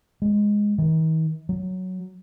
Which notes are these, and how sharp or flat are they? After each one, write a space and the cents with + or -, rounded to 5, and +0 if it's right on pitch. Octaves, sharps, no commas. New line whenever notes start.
G#3 -5
D#3 +45
F#3 +5